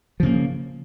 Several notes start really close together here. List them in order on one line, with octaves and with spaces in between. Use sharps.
F3 C#3 A#3